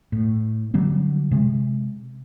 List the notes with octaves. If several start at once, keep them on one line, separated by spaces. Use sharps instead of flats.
A2
D3 F#3 G3 C4
C3 G#3